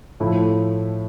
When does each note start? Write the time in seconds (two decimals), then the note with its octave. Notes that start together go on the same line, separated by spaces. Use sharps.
0.20 A2 F3 A3 E4